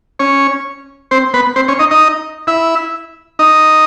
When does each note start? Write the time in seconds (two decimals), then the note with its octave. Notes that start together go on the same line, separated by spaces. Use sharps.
0.19 C#4 C#5
1.11 C4 C5
1.34 B3 B4
1.56 C4 C5
1.68 C#4 C#5
1.79 D#4 D#5
1.91 D#4 D#5
2.47 E4 E5
3.39 D#4 D#5